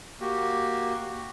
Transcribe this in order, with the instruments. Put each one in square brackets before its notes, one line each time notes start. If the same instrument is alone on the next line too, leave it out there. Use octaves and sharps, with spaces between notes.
[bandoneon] A#3 F#4 G4